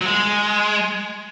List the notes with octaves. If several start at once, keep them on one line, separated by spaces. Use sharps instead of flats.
F#3
G#3